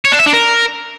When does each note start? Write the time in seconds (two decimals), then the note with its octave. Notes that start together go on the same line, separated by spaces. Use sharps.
0.05 C#5
0.12 D4
0.19 E5
0.26 D4
0.33 A#4